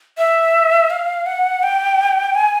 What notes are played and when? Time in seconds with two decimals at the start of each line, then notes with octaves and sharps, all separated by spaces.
0.18 E5
0.90 F5
1.26 F#5
1.63 G5
2.35 G#5